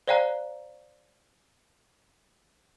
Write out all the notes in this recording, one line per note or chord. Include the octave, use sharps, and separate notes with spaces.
C5 D5 F5 G5 A#5 F#6